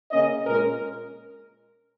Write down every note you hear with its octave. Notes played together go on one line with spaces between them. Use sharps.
C#3 A#3 C#4 D#5
A#2 G#3 C#4 A#4